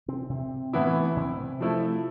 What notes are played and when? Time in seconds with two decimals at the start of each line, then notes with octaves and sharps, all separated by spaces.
0.08 C3 C4
0.30 C3 C4
0.73 A2 E3 B3 E4
1.17 C3 C4
1.60 F3 A3 E4